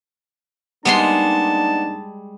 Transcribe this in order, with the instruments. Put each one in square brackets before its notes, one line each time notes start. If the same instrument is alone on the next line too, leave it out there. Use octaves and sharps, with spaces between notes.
[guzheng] G3 G#3 C6 [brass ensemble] A#3 D4 D#4 [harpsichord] B3 [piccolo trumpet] A5